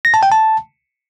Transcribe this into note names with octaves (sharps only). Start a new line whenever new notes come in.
A#6
A5
G5
A5